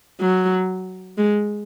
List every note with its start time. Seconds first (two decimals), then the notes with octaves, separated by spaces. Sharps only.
0.21 F#3
1.18 G#3